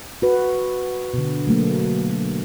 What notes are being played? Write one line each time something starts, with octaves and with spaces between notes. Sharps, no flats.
F#4 B4
B2 D3
F#3 A3 A#3